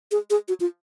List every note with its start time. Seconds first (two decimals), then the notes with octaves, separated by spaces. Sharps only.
0.11 G#4
0.30 G#4
0.48 F#4
0.60 F4